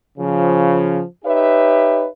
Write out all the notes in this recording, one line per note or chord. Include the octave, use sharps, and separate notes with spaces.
C#3 F3
D#4 G4 B4 C#5 E5